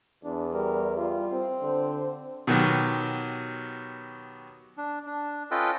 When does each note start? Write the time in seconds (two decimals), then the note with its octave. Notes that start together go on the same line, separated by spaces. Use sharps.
0.24 E2 D4
0.54 G3 A#4
0.97 G3 F4
1.32 C4
1.61 D3 C5
2.47 B2 D#3 F#3 G4
4.77 D4
5.06 D4
5.51 C#4 F4 A4 B4 D#5 G5